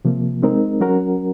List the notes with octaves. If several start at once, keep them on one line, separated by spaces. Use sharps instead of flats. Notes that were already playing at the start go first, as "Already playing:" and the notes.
C3 F3 A#3
G#3 C4 D#4 A#4
F#3 C#4 F#4 A#4